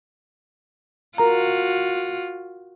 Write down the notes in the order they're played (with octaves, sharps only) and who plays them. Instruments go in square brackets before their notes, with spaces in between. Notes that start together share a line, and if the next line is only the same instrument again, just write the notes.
[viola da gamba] F4 F#4 [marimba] A#4 A#5